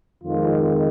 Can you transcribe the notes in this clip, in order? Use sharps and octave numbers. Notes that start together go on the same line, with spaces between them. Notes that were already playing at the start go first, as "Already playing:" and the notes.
F2 D#3 G#3 F4